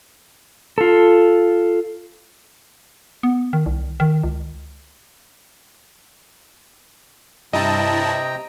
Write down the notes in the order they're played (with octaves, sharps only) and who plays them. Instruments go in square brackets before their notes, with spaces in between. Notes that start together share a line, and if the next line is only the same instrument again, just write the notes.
[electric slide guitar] F4 A4
[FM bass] B3
D#3
C2
D#3
C#2
[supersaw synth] G2 E4 A5 [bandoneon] C3 G5 A#5 [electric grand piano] D#5